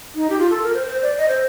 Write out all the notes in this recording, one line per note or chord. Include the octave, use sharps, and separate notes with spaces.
D#4
G4
F4
A4
A#4
C5
C5
D5
D#5
C5